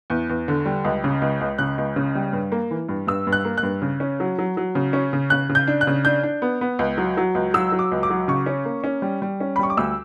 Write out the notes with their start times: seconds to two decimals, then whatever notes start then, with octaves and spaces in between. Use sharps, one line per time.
0.10 E2
0.29 E2
0.48 D3
0.66 G3
0.85 C#2
1.04 C#3
1.22 C#2
1.41 C#2
1.58 C#3 F#6
1.78 C#2
1.96 C#3
2.15 G3
2.33 G2
2.52 A#3
2.71 E3
2.89 G2
3.07 G2 E6
3.27 G2
3.32 F#6
3.45 A#3
3.57 F#6
3.63 G2
3.82 C#3
4.00 C#4
4.20 F#3
4.39 F#3
4.57 F#3
4.75 C#3
4.93 C#4
5.13 C#3
5.30 C#3 F#6
5.49 C#3
5.55 G6
5.68 D4
5.81 F#6
5.87 C#3
6.05 D4 G6
6.23 D4
6.42 B3
6.61 B3
6.79 C#2
6.98 F#3
7.17 F#3
7.35 C#2
7.54 F#3 E6
7.72 F#3
7.79 D6
7.92 C#2
8.03 D6
8.10 F#3
8.28 C#3 C#6
8.46 C#4
8.65 A#3
8.84 C#4
9.02 G3
9.22 G3
9.40 C#4
9.56 B5
9.59 G3 C#6
9.70 D6
9.77 D2 E6